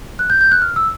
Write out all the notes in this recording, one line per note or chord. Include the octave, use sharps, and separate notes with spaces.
F#6
G6
G6
F#6
F6
E6